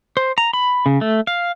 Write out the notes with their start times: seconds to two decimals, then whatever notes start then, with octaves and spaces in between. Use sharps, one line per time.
0.17 C5
0.38 A#5
0.53 B5
0.86 C#3
1.01 A3
1.27 F5